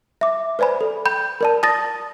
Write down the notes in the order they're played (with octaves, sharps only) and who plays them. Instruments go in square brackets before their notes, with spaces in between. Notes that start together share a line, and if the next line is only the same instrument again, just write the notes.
[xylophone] E5 D6
B4 C5 D5 G#5 B5
A4
G5 B5 G6
A#4 D5 A5
A5 D#6 A6 A#6